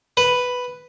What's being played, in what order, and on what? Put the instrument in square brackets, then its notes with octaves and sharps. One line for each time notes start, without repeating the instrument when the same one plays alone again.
[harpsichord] B4